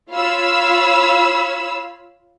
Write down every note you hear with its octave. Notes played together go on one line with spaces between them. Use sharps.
F4 C#5 F5 B5 E6